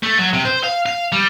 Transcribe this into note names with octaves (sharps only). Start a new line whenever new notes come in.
A3
F#3
C3
C5
F5
F5
G3